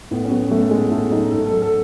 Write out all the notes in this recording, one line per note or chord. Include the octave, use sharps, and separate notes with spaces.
A2 B3
C#4
F#3 B3
F#3 A3
A3
A2 G#3
A2 A3
F#3 D#4
G#2 A4
A4
F#3
A4